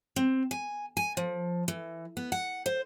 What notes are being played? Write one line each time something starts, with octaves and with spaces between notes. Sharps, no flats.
C4
G#5
G#5
F3
E3
B3
F#5
C5